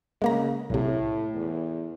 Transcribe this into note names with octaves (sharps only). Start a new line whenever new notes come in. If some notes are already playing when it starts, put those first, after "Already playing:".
C#3 G#3 A#3 A#5
B1 A2 C3
E2